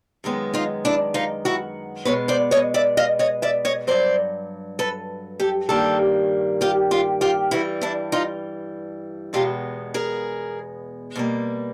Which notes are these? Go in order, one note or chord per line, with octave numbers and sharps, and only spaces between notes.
F#2 D#3 G#3 B3
D#4 F4
D4 E4
D#4 F4
E4 F#4
B2 G#3 B3 B4 C#5
C5 D5
C#5 D#5
D5 E5
D#5 F5
C#5 D#5
D5 E5
C#5 D#5
G2 D#3 F#3 C5 D5
A4 B4
G4 A4
G2 D#3 G3 A#3 G4 A4
F4 G4
F4 G4
F4 G4
G2 E3 G3 E4 F#4
D4 E4
D#4 F4
E2 B2 G#3 B3 F4 G4
G#4 A#4
B2 G3 A#3